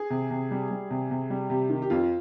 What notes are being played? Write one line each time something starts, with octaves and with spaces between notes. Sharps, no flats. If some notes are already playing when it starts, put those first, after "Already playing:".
Already playing: G#4
C3
C3
G3
G3
C3
C3
G3
C3 G4
D#3
G4
F2 F4